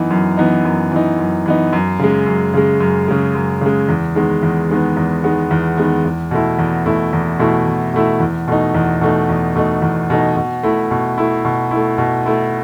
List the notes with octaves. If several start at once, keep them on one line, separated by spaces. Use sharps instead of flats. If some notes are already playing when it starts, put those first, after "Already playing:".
Already playing: F#2 E3 B3 D#4
F#2
E3 B3 D#4
F#2
E3 B3 D#4
F#2
E3 B3 D#4
F#2
C#3 G#3
F#2
C#3 G#3
F#2
C#3 G#3
F#2
C#3 G#3
E2
D#3 G#3 B3
E2
D#3 G#3 B3
E2
D#3 G#3 B3
E2
D#3 G#3 B3
E2
B2 A3 E4
E2
B2 A3 E4
E2
B2 A3 E4
E2
B2 A3 E4
E2
B2 A3 D#4
E2
B2 A3 D#4
E2
B2 A3 D#4
E2
B2 A3 D#4
B2
A3 E4
B2
A3 E4
B2
A3 E4
B2
A3 E4